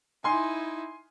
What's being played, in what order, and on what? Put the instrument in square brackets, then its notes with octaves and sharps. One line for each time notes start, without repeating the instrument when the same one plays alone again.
[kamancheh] D#4 E4 [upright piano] G#5 C6